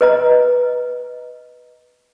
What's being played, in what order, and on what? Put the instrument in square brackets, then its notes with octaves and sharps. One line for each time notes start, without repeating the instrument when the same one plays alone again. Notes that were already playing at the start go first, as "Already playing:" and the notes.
[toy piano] B4 D#5 A#5